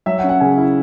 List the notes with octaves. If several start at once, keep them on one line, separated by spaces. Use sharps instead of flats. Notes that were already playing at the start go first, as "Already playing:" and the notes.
F#3 E5
F#5
C#4
F#5
C#3 G#5
E4